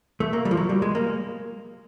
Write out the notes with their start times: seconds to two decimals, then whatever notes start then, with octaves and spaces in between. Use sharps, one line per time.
0.20 A3
0.33 A#3
0.45 G3
0.51 F3
0.57 F#3
0.69 G3
0.82 G#3
0.95 A#3